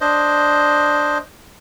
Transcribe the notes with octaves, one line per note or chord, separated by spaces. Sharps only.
D4 C5 D#5